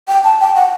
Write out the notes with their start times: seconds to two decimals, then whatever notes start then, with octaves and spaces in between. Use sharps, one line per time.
0.08 G5
0.24 A5
0.40 G5
0.56 F#5